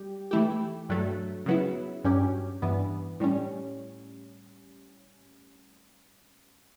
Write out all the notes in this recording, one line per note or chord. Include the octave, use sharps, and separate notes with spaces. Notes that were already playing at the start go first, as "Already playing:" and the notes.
Already playing: G3 G4
E3 A3 E4 G4
G2 F#3 A3
C#3 F#3 B3 E4
G2 F#3 C#4 G4
G2 E3 B3
A2 G3 C#4